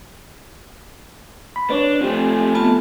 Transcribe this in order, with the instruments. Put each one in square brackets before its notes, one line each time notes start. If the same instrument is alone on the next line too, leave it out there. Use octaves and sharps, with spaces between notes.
[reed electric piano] B5
[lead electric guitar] D4 [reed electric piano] B4 C#5 D5
[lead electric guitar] F3 A3 [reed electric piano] C4 G4
[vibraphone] B3 F4 A5